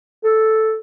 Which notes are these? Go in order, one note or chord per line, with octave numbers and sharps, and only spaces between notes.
A4